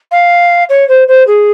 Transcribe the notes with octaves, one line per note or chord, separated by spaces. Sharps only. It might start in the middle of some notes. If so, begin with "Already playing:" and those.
F5
C#5
C5
C5
G#4